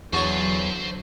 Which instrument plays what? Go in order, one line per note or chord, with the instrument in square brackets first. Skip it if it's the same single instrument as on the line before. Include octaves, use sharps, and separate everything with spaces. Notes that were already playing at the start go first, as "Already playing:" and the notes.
[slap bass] E2 [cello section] D3 F#3 [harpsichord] F#4 C#5 [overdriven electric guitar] C5 A5